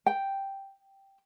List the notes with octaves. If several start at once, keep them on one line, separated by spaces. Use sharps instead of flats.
G5